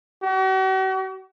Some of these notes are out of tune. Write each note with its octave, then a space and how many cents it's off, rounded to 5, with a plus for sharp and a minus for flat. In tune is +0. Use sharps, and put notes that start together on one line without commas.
F#4 +45